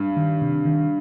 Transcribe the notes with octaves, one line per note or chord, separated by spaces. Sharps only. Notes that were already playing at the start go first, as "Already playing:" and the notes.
Already playing: G2
D#3
C3
D#3